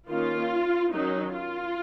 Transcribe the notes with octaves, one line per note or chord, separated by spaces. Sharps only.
D#3 A#3 C#4 F4
D#3 F#3 C#4 D#4
F4